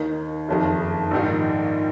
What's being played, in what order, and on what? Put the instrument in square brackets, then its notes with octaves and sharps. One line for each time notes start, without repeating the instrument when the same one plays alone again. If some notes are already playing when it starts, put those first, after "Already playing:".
Already playing: [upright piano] D#2 D#3 A#3 D#4 A#4
F#1 F2 D#3
A#1 G#2 D#3 A#3 D#4